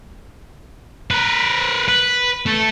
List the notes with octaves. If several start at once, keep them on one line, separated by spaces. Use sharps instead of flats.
A#4 B4
B4
A3 A4